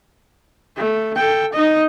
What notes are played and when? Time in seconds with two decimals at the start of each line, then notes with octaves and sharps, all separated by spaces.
0.77 A3
1.16 A4 G5
1.53 D#4 D#5